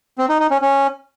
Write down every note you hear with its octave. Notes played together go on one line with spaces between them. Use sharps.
C4
D#4
D#4
C#4
C#4